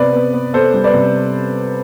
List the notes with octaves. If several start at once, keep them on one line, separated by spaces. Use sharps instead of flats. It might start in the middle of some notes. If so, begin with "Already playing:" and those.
Already playing: C3 B3 B4 D5
B3
B3
B3 A4 C5
G3
B4 D5
C3